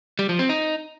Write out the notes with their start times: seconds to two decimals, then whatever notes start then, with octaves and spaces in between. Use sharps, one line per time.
0.19 G3
0.29 F3
0.39 C4
0.49 D#4